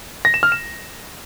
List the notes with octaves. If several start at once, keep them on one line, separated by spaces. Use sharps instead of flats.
A#6
E7
F6
E7